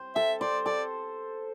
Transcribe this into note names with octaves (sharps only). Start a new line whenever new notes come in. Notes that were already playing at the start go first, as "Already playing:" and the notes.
Already playing: C5
A4 E5
C5 D5
A4 D5